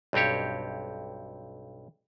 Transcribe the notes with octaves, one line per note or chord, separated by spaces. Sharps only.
B1 G2 C4 G4 C#5